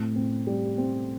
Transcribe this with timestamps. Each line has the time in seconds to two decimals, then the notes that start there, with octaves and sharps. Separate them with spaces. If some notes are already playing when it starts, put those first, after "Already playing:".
Already playing: A2 C4
0.16 C4
0.47 G3
0.78 C4